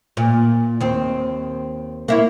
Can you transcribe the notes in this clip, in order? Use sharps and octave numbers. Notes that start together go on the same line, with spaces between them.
A#2
D#2 C4
A#3 E4 C#5